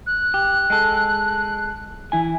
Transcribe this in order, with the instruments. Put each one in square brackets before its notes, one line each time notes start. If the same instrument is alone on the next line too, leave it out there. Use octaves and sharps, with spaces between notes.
[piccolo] F#6
[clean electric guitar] G4
G#3 A4
E3 E4 G#5